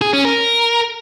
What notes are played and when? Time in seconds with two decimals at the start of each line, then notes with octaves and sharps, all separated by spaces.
0.01 G#4
0.13 C#4
0.25 A#4